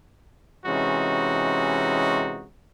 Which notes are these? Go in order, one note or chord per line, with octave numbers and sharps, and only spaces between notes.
C3 E3 G#3 C#4 D#4 F#4